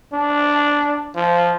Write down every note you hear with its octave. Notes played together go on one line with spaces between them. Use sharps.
D4
F3